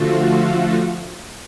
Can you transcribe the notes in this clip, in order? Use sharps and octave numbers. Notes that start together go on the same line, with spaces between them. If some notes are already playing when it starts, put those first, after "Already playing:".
Already playing: D3 F3 A3 F4 F#4 A4